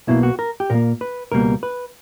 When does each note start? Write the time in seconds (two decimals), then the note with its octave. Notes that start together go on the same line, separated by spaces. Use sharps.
0.07 B1 B2 A#3 E4
0.23 F#4
0.39 A#4
0.60 G4
0.70 A#2 A#3 A#4
1.01 B4
1.32 C#2 B2 G3 A#3 A#4
1.63 B4